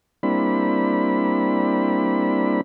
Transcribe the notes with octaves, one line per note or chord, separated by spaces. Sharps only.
G3 A#3 C4 D4 E4 B5